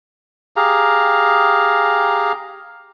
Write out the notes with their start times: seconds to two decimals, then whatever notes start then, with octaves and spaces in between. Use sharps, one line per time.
0.56 G4 G#4 F5 A#5